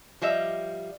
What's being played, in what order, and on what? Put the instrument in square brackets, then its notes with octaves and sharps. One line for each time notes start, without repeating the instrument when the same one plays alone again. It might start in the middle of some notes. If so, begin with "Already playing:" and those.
[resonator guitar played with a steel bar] F3 G3 D#5 E5